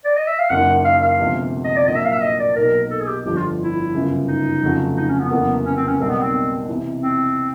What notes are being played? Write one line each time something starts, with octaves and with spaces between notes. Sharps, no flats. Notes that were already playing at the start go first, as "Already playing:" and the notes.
D5
D#5
E5
F5
F#1 F#2 D#3 F#5
F5
F5
D2 C3 F3 G#3 B3
D#5
D5
A#1 A2 F#3 A#3 D#5
E5
F5
E5
D#5
D5
B1 B2 F#3 A#3 D#4 A#4
A4
G#4
G4
G1 F2 D3 F3 G4
F4
E4
G1 F#2 C#3
D#4
F1 F2 C#3 F#3 A3
D#4
C#4
B3
F1 E2 C#3 F#3 A#3
C#4
C4
C#4
B1 B2 G3 A#3 C4 D#4
B3
C4
E2 C3 E3
C4